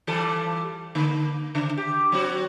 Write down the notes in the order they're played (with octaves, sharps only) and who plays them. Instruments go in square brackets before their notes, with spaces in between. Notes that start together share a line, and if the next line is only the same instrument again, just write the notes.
[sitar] E3 G3 A4
D3 A#3
C#3
G4
F#3 C4 F#4